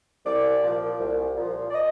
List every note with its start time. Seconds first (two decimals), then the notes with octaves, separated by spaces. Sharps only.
0.24 C2 D5
0.62 A#2 F3
0.99 C2
1.36 A#2 F3
1.69 D5
1.74 D#5